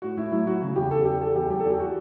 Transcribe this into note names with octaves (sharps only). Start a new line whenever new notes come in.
A2 F#4
A2 E4
F#3 E4
F#3 F#4
C#3
E2 G4
E2 A4
E2 G4
E2 A4
E2 G4
F#3 G4
A4
E2
G4
F#4